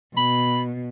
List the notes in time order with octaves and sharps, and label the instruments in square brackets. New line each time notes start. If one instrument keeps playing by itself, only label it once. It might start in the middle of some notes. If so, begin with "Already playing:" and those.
[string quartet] B2 [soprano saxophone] B5